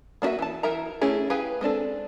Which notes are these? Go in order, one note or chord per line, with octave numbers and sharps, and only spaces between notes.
A#3 D4 F#4 B4 E5
E3 A5
E3 A#4 E5 A#5
A3 C#4 E4 G#4
G4 G#4 B4 F5 G#5
G#3 C4 D4 A4